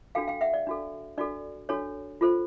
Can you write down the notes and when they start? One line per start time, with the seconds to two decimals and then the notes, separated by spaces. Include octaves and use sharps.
0.15 D4 F#4 A4 F5 G5
0.28 F5 G5
0.41 E5 F#5
0.54 D5
0.67 D4 F#4 A4
1.18 D4 F#4 A4 D5
1.69 D4 F#4 A4 C#5
2.21 F4 A4 C5